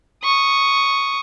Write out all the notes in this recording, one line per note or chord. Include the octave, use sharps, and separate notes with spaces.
C#6 D#6